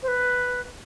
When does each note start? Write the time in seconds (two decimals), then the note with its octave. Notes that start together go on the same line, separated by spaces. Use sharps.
0.03 C5
0.08 B4